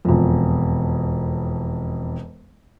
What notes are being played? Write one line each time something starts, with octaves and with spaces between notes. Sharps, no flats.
E1 F2